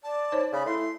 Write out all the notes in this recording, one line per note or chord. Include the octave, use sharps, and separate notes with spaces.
D5 A5
D#4 C5 C#5
C#3 B5
A3 E4 C6